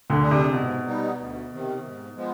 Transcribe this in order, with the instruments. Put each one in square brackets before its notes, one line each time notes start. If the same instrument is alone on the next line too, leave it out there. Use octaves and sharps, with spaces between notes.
[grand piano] D2 D3
[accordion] G3 D4 G#4
[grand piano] C3
[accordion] G#2 [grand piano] B2
[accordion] G3 B3 D#4
D2
C3 D#3
G#2
F3 G#3 B3